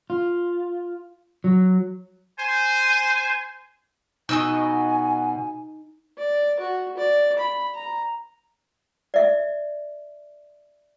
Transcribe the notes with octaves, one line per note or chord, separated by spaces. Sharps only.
F4
F#3
C5 G#5
B2 D#4 F#4 D#5 G#5 E6
D5
F#4
D5
B5
A#5
D5 E5